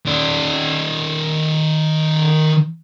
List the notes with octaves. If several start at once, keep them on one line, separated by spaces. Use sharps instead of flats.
D#3 D5